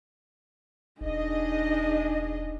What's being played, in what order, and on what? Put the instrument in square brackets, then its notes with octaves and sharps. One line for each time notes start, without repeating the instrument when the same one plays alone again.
[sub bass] E1 [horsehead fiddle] D4 D#4 [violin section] G#4 D#5